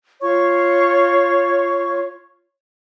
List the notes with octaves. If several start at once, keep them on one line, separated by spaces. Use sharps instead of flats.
F4 C#5 C#6